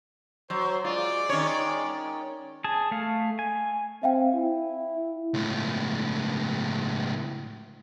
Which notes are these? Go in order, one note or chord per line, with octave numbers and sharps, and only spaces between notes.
F#3 C5
G#3 F4 D5
D#3 C#4 C#5
G#4 A5
A3 F5
G#5
C4 E5 F5 G5
E4
C#2 A2